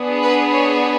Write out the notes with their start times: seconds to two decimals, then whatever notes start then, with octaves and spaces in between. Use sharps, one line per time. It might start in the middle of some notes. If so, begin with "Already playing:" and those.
Already playing: B3 D4 G#4
0.22 B4
0.52 C#5